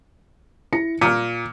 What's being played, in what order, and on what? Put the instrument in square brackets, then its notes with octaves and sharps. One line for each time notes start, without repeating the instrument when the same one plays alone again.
[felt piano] E4 A#6 C#7
[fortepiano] A#2 [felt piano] F6 C#7